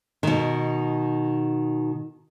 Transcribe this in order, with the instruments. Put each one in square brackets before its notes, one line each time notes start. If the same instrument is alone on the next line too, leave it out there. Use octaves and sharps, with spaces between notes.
[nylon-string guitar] B2 D#3